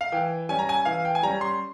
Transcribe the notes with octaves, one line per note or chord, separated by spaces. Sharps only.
F5
E3 G5
G3 C#4 G#5
A#5
G#5
E3 F5
G5
G#5
G3 C#4 A#5
C6